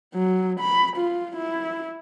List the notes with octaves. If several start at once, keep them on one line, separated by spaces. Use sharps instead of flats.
F#3
B5
F4
E4